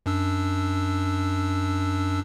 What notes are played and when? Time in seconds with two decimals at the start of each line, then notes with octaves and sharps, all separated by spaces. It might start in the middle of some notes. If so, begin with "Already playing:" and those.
0.06 F#2 D4 E6